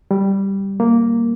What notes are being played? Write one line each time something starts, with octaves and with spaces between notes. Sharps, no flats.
G3
A#3